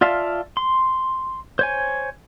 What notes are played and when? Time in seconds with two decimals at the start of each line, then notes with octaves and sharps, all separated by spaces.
0.01 F4 D5 E5 F5 A5
0.57 C6
1.59 C5 C#5 G#5